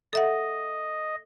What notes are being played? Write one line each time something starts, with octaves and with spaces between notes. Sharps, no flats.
A4 D#5 E5 F#5